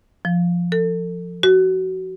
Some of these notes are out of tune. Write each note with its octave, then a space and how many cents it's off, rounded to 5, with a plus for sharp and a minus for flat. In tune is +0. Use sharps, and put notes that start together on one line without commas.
F3 +0
A4 +30
F#4 +25